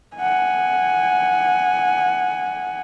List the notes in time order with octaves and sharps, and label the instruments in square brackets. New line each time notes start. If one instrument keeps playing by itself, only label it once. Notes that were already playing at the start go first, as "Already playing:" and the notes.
[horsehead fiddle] F#5 G#5